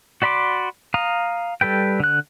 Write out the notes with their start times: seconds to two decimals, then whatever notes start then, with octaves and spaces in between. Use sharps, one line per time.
0.22 F#4 D5 B5 C6 D6
0.94 F5 A#5 D#6
1.61 G3 A4 B4 G5
2.00 D3 F#6